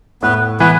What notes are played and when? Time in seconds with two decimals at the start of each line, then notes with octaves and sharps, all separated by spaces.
0.22 A2 B3 B4
0.60 E3 B3 B4